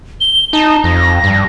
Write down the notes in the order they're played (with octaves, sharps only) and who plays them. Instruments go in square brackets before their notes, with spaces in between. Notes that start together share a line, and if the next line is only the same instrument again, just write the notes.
[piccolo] G7
[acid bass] D#4 [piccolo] A5
[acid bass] F2 [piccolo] A#6
[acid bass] G2